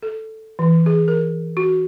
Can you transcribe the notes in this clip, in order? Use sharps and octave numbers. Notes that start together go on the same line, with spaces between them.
A4
E3
G#4
A#4
F#4